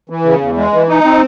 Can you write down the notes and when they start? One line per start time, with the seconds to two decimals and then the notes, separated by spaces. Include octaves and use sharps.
0.10 E3
0.25 C#3
0.41 E2
0.57 G#3
0.73 E3
0.89 D#4
1.04 C4